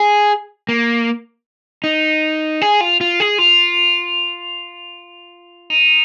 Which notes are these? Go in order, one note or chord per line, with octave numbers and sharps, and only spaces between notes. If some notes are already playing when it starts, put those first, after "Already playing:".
Already playing: G#4
A#3
D#4
G#4
F4
F4
G#4
F4
D#4